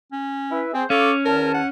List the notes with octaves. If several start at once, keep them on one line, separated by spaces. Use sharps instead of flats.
C#4
E4 B4 E5
C4 G#4 C5
C#4 A4 F5 C#6 D6
E2 D#3 A#4 A5
F#5